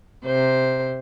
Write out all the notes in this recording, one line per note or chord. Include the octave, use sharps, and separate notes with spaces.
C3 C5